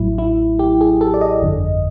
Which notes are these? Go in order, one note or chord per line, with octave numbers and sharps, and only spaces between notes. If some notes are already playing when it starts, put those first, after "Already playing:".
Already playing: A1 A2 F#3 E4
E4
G4
G#4
A4
D5
D#5
G1 F2 D3